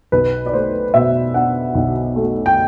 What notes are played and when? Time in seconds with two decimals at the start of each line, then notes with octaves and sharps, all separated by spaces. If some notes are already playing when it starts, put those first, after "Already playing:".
0.12 B1 B4
0.46 D5
0.53 A3 C5
0.94 B2 E5
1.34 D4 F#5
1.75 B1
2.16 A3
2.46 G5